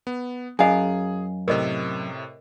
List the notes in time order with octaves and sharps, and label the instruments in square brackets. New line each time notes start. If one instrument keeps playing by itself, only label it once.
[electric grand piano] B3
[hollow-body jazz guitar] F#2 F5 [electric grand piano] G#4 [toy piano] D#5 G#5
[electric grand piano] A2 C3 [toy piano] A#4 D#5